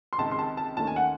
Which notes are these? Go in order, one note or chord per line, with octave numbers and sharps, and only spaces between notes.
C6
C#2 C3 D#3 G#3 A5
C6
A5
A5
D#2 D#3 A3 C#4 A5
G#5
F#5